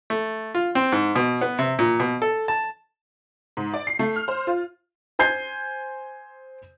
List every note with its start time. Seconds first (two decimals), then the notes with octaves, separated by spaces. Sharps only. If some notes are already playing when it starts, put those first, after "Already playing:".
0.10 A3
0.55 F4
0.75 C4
0.92 G#2
1.16 B2
1.41 B3
1.59 C3
1.79 A#2
2.00 B2
2.22 A4
2.48 A5
3.57 G#2
3.74 D5
3.87 C7
3.99 A3
4.16 F6
4.28 C5
4.47 F4
5.19 C5 G#5 G6 C7